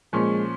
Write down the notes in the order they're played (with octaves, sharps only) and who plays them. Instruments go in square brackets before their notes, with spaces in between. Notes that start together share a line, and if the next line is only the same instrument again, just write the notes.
[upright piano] A#2 F3 C#4 [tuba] G#3